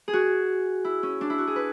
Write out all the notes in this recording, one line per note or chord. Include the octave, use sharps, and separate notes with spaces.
G#4
F#4
E4
C#4
D4
E4
F#4
G#4
B4